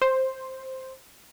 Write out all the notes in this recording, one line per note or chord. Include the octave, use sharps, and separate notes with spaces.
C5